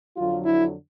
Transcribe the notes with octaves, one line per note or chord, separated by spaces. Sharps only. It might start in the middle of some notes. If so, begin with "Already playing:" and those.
F2 D3 F#3 F4
E4